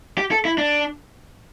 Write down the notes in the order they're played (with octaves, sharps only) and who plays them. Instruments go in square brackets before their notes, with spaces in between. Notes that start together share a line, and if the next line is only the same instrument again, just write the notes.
[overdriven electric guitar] G4
A4
E4
D4